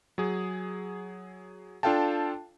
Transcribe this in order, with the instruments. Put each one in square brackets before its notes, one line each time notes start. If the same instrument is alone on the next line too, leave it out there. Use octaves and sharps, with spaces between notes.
[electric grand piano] F#3 G#4
D4 F4 A4 F5 G5 A5